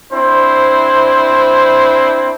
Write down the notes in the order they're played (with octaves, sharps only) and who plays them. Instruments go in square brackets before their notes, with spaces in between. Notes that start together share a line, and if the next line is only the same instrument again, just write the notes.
[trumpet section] C4 D4 E4 C5